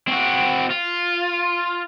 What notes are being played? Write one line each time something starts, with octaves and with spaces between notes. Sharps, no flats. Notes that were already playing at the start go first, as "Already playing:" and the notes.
C4 F#4
F4